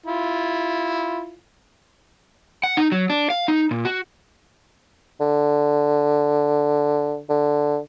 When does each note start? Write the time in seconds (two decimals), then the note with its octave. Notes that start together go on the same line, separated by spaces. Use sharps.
0.06 E4 F4
2.63 F#5
2.77 D#4
2.92 F#3
3.10 D4
3.30 F5
3.48 D#4
3.71 A#2
3.85 F#4
5.21 D3
7.30 D3